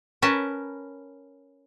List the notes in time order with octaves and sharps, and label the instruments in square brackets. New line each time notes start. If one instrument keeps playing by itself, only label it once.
[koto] C#4 A#4 B4 A5